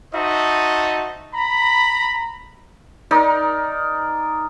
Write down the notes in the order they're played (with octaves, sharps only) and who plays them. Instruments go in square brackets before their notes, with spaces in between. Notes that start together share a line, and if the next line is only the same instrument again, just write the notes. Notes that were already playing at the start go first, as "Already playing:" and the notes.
[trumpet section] D#4 F#4 C5 D#5 E5 A5
A#5 B5
[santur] D#4 A#4 D5